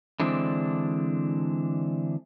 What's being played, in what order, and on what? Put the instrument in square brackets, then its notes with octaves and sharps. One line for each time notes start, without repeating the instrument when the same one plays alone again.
[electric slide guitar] D3 E3 G#3 C4 D4